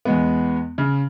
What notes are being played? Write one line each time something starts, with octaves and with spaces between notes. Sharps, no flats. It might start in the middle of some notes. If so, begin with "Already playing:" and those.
E2 G#3 B3
C#3